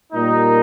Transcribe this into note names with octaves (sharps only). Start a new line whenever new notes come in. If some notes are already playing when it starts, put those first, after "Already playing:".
A#2 G3 A#3 D#4